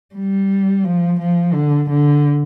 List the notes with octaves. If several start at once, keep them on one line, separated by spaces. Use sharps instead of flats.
G3
F3
F3
D3
D3